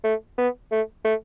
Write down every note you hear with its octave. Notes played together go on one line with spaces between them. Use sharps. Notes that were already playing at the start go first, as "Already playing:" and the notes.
A3
B3
A3
A3